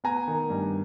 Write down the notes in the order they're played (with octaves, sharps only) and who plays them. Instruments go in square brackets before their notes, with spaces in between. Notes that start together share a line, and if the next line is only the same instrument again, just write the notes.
[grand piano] B3 G#5 A#5
D#3
G2